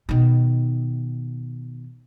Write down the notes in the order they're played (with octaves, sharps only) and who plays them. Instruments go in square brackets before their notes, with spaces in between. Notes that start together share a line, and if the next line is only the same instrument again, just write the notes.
[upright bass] B2 D#3